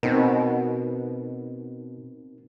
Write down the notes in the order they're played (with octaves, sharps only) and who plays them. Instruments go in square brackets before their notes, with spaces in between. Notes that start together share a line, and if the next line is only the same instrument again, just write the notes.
[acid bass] B2 [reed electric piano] C4 D#4 A#4